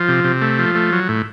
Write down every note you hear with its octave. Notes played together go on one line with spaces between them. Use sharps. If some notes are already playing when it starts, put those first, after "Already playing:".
Already playing: F3
C3
C3
A3
F3
A3
F#3
A2